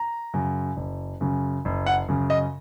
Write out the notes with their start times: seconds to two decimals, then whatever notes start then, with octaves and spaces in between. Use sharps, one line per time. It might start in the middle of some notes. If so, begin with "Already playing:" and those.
Already playing: A#5
0.34 F#2 C#3
0.77 F#1
1.21 F#2 C#3
1.65 F#1
1.86 F#5
2.08 F#2 C#3
2.30 D#5